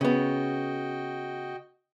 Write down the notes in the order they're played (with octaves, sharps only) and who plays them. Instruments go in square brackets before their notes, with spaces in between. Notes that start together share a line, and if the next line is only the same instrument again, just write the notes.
[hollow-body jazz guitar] C#3 B3 [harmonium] F#4 D#5 G5